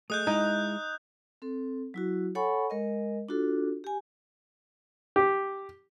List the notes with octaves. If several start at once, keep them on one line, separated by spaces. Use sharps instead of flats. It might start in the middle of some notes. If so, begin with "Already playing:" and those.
A3 G#4 D#5 D#6 F#6 G6
G#3 D#4 E4
C4 A4
F#3 E4 F#4
A4 C#5 F#5 G#5 B5 C#6
G#3 A#4 D#5
D4 F4 F#4 A4
G4 G#5
G4